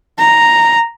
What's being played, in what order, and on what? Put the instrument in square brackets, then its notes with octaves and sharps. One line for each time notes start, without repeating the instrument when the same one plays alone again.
[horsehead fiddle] A#5